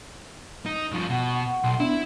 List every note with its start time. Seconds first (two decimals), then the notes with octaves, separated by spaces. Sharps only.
0.66 D#4
0.91 G2 F3 C#6
1.10 B2 F#5
1.63 B1 C6
1.80 B3 D4 E4